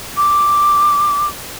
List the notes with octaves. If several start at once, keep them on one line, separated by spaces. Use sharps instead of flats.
D6